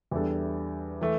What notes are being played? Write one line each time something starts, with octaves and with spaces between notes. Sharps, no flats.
E2 E3 G3 D4 A4
E3 A3